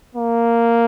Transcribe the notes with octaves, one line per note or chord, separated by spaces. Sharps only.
A#3